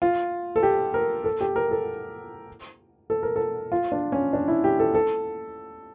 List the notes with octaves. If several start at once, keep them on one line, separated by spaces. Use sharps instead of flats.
F4
A4
G4
A#4
A4
G4
A#4
A4
A4
A#4
A4
F4
D4
C#4
D4
E4
G4
A4
A4